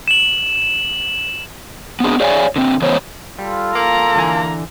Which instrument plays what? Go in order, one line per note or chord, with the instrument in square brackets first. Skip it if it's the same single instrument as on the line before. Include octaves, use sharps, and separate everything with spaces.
[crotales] E7 F#7
[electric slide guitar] B3 C4 D4 G#4
G#4 C#5 D5 F5 G5 G#5
D3 C4
C#3 E3 B3 C5 C#5
[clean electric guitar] G3 [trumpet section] F4 A4
[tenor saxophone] A#3 [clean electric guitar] F5 [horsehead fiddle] A#5
[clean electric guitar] D3 E3 G#5